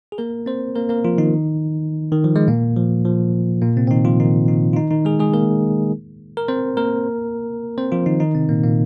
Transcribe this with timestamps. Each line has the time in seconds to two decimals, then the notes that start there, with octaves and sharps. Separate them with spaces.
0.12 G#4
0.18 A#3 A#4
0.46 C4 C5
0.75 A#3 A#4
0.89 A#3 A#4
1.04 F3 F4
1.18 D#3 D#4
2.12 D#3
2.24 F3
2.36 G#3
2.48 A#2 A#3
2.77 F3
3.05 F3
3.62 A#2 A#3
3.76 C3 C4
3.87 C4
3.91 D#3 D#4
4.05 F3 F4
4.20 D#3 D#4
4.48 D#3 D#4
4.73 F4
4.76 D#3 D#4
4.91 D#3 D#4
5.05 G#3 G#4
5.19 G#3 G#4
5.34 A#3 A#4
6.37 A#4
6.48 C4 C5
6.77 A#3 A#4
7.78 C4 C5
7.92 F3 F4
8.06 D#3 D#4
8.20 D#3 D#4
8.35 C3 C4
8.49 A#2 A#3
8.64 A#2 A#3